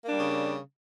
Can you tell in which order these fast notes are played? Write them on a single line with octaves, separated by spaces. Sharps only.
A#3 D4 G3 C#3